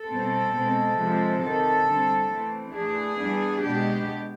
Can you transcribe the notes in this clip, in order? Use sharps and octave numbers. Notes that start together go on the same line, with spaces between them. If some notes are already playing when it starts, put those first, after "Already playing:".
Already playing: A4
B2 G3 C4
B2 G#3 C4
C3 F3 G#3 C4
C3 D#3 F#3 A4
D3 G3 C4
E3 A3 C4
E3 A3 D4 G#4
E3 G3 B3 D4
B2 G#3 B3 D4 G4